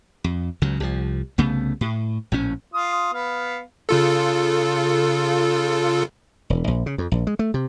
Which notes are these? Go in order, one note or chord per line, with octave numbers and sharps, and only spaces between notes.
F2
C#2 C#3 F#3
C2 F3
C2 C#3 A3 B3
A2
A#1 A2 C#4
F4 D#6
B3 F5
C#3 F4 A4
E1
A#1
C#3
F2
A#1
G#3
A3
C3